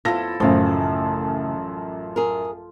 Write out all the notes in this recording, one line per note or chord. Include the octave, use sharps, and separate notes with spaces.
F2 B3 E4 F4 A4 A#6
A1 F#2 A2 C#3 F3
G#4 A#4